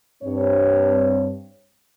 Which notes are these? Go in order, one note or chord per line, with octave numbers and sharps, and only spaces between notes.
G2 C4 C#5